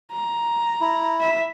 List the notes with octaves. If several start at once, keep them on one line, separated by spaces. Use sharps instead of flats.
A#5
E4
E5